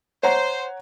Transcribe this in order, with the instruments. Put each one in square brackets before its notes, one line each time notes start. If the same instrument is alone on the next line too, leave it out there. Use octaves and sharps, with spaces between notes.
[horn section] C5 [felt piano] C#5 F#5 A#5